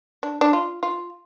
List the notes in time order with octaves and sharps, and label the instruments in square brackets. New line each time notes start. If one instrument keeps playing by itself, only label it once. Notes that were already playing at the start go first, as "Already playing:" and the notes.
[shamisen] D4
D4
F4
F4